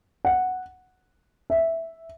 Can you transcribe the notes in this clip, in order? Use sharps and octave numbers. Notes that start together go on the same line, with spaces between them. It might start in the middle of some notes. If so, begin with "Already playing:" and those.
F#5
E5